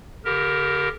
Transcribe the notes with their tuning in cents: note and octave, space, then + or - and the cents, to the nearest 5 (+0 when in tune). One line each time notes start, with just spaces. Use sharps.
D3 -40 G4 +0 A#4 +5